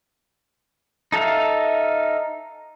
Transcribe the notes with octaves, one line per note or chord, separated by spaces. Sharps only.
D#4 A4 E5 F5